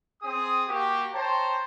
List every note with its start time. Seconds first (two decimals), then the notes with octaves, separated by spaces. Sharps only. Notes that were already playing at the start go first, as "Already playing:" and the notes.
0.22 C4 G#4 D#6
0.68 A#3 F#4 G4
1.14 C5 C#5 G5 A5 A#5